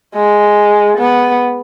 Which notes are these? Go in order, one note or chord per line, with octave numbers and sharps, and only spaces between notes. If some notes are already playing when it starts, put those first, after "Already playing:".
G#3
B3